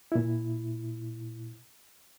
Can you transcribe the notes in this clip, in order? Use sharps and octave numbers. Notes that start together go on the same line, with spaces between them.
A#2 E4